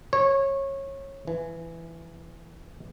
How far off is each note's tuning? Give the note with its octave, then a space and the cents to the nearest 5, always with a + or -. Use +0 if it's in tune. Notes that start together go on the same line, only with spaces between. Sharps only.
C#5 -20
E3 +10